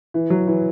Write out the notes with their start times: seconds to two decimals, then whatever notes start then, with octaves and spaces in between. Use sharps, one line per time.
0.14 E3
0.30 F#3
0.47 E3